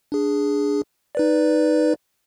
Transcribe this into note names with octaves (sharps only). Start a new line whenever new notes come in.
D4 G#4
D#4 B4 D5